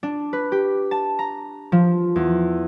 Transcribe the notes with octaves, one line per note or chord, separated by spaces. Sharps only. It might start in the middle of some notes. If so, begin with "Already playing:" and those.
D4
B4
G4
A5
A#5
F3
E2